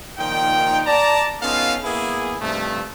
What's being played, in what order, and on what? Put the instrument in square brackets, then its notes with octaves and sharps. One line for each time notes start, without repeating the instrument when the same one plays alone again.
[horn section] A#2 D#3 F3 D#4 G5
D5 A5 A#5
B3 C#4 D#4 F4 A4 F5
A#3 B3 E4 G#4
G2 C3 D#3 F3 A3